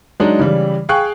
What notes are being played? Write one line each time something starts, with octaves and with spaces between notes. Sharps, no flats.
F#3 G#3 D4 D#4
C#3 E3 G3
G#4 F5 G5 G#5 C#6 F#6